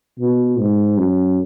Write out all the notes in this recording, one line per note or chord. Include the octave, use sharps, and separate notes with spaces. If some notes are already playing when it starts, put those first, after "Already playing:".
B2
G#2
F#2